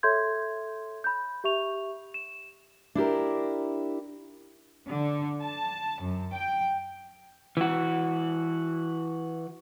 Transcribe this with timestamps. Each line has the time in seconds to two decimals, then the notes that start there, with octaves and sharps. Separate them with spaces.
0.03 A4 C#5 E5 C6 G6 G#6
1.04 B5 G6
1.44 G4 E5 C#6 F7
2.14 E7
2.95 D4 E4 G4 A#4
4.90 D3
5.41 A5
6.02 F#2
6.34 G5
7.57 E3 F#4